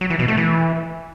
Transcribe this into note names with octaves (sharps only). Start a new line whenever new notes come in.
F#3
E3
B2
A3
E3